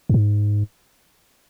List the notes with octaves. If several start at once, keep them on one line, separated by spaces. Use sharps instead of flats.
F#2
G#2